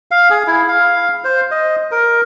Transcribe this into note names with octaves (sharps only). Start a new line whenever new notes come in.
F5
G#4
E4
F5
C5
D#5
A#4